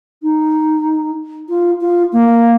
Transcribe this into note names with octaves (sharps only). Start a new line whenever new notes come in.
D#4
F4
F4
A#3